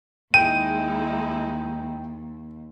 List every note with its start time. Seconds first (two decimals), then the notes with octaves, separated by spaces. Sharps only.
0.34 D#2 G#3 D#4 E4 G5 D#7